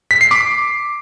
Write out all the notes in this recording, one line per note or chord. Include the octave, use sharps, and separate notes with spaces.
B6
C7
D6